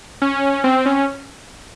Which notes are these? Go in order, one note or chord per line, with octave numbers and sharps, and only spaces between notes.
C#4
C4
C#4